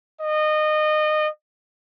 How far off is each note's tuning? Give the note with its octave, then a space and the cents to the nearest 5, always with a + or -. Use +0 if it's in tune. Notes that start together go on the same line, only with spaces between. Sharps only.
D#5 -25